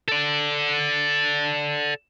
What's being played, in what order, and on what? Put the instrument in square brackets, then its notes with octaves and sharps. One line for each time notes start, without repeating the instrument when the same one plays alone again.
[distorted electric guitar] A4 D5